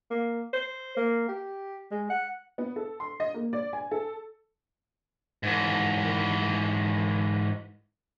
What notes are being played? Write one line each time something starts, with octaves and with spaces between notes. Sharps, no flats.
A#3
C5
A#3
G4
G#3
F#5
B3
A4
C6
D#5
A#3
D5
G#5
A4
G#2 E3